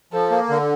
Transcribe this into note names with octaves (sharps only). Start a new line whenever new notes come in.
F3 A4
A#3
D3